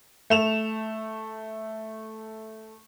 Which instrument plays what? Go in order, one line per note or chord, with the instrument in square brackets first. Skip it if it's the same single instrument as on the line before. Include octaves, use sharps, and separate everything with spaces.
[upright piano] A3 E7 F7